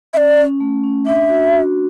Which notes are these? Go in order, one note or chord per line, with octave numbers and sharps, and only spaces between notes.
C#4 D5 E5
C#4
A3
C#4
D4 E5
F#4
F#4